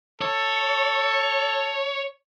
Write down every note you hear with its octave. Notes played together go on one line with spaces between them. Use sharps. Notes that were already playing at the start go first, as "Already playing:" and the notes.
A4 C#5